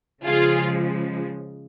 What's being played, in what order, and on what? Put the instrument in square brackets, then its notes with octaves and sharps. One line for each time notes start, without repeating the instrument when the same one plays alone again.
[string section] C#3 F3 G#3 F4 G#4